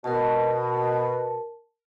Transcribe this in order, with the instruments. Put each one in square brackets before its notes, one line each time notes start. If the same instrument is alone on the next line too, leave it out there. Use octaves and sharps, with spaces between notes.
[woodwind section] B2 [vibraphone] A#4 A5